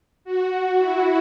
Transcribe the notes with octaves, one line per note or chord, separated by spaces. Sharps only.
F#4
E4